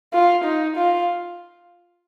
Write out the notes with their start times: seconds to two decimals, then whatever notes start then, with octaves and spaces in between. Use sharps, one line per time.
0.13 F4
0.45 D#4
0.77 F4